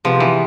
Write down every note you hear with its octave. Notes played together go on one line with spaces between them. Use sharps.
C3 F3 G#3 B3
E3